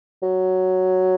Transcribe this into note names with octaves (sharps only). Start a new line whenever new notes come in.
F#3